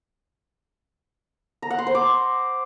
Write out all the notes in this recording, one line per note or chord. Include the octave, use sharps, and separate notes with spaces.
A#5
F#5
C6
C5
D6